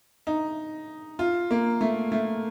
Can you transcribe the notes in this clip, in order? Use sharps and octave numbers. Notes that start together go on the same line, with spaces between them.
D#4
F4
A#3
A3
A3